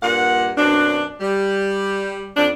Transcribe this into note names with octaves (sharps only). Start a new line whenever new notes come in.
G2 A#2 A#3 F#5
F#2 B2 C4 D4
G3
F2 D4